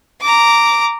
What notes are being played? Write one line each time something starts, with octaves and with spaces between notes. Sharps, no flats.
A#5 D6